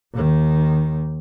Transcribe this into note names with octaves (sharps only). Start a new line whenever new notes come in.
D#2 D#3